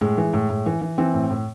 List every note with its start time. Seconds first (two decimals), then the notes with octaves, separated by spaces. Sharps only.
0.01 A2 G#3
0.17 E3
0.33 A2
0.50 A2
0.66 E3
0.81 E3
0.98 E3 C4
1.14 A2
1.30 A2